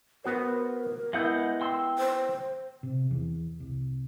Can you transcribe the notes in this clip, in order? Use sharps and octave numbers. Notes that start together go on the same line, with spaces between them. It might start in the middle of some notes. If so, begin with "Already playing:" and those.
B3 F#4 A#4 C5
G#3 B3 E4 E5 F#5 G6
G5 C6 E6
C5
C3
E2
C2